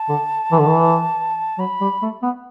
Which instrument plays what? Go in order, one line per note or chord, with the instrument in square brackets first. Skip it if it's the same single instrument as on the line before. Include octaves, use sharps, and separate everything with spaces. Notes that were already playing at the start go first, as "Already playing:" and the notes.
Already playing: [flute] A5
[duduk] D3
E3
D3
E3
[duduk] F#3 [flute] B5
[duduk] G3
A3
B3